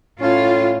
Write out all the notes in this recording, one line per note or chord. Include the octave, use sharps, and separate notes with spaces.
A2 C#4 F4